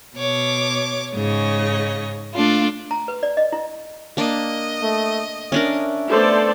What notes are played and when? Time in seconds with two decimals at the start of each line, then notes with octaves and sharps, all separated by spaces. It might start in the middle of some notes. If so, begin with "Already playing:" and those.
0.17 B2 C#5 D6
1.14 G#2 C#3 C#5 D#5
2.34 A3 D4 F4
2.91 A#5
3.08 B4
3.23 D5
3.37 D#5
3.53 E4
4.17 A#3 D4 D#5
4.82 A3
5.52 C#4 D4 A#4 E5
6.09 A3 B3 A4 C5 D5